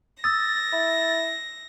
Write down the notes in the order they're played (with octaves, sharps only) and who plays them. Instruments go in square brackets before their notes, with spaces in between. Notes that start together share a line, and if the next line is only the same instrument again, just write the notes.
[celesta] D#6 E6 [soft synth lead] A6 [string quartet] A#6
[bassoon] E4